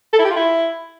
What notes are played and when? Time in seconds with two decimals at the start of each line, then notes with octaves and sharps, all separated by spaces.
0.13 A4
0.19 E4
0.24 G4
0.30 F4
0.36 E4